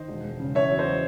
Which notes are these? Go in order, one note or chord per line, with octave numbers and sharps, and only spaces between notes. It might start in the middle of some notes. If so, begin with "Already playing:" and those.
Already playing: D#3 C5 D#5
E1
G#3
C#3
E2 C#5 E5
F#3
C5 D#5
F#3